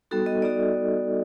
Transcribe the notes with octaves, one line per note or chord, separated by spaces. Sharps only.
G3 B3 D#4 F#4 A4
D#5
G3 B3 D#4 F#4 D5